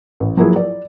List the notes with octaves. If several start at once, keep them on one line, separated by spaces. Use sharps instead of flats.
A1
F3 F#3 A#3 E4 G#4
D5